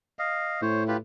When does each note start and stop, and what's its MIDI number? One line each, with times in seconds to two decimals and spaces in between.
0.19 0.61 75
0.19 0.61 77
0.62 0.98 45
0.62 0.84 72
0.62 0.84 73
0.88 0.97 65
0.88 0.97 67
0.88 0.97 71